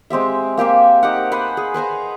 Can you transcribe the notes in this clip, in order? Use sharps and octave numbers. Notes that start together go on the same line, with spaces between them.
G#3 C4 G4 E5
A#3 G4 C5 E5
D#4 G4 F#5
B4 C5 F#5 G#5
G#4
B4 C5 G#5 A#5